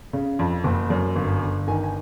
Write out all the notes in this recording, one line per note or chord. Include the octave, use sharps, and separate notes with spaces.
C#3
F2
F#1
F#2
G1
G1
D#3 G#5
G#5